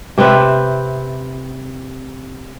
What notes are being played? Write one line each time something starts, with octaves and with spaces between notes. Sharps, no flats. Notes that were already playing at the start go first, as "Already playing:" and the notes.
C3 C4 B4 E5